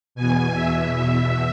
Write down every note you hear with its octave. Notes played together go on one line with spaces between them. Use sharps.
E2 B2 G#5
E5
E5